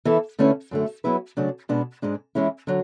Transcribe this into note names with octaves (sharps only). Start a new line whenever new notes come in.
E3 B3 E4 A4
D3 A3 C#4 E4 B4
F#2 D3 A3
F#3 B3 E4 G#4 B4
C#3 F#3 A3 D4
B2 G#3 B3 D4
G#2 G#3 D4
E3 G#3 C#4 E4
D3 F#3